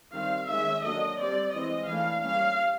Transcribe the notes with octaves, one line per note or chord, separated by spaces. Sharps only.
D#3 G3 C4 F5
D#3 G#3 C#4 E5
D3 F#3 A#3 D4 D#5
G3 C4 D5
E3 G#3 C4 D#5
E3 A3 D4 F5
G3 A#3 C#4 F5